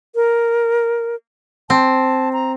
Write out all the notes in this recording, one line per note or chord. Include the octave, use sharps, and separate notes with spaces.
A#4
C4 A5
A#5